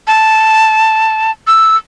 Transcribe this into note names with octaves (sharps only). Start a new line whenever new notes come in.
A5
E6